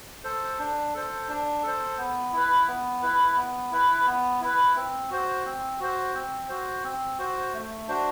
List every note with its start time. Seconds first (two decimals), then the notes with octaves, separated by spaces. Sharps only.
0.24 A4 C5
0.59 D4
0.94 A4 C5
1.28 D4
1.63 A4 C5
1.98 B3
2.33 E4 B4
2.68 B3
3.02 E4 B4
3.36 B3
3.71 E4 B4
4.06 B3
4.41 E4 B4
4.75 C4
5.10 F#4 C5
5.45 C4
5.80 F#4 C5
6.14 C4
6.49 F#4 C5
6.84 C4
7.19 F#4 C5
7.53 A3
7.88 D4 F#4 C5